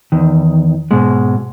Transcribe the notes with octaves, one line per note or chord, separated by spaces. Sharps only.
E2 D#3
G#2 B2 G#3